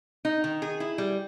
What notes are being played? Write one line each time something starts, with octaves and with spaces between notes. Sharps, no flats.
D#4
D#3
G#4
E4
G3